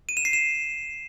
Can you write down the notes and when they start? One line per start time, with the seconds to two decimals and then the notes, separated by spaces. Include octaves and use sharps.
0.09 D#7
0.17 E7
0.25 C7
0.33 E7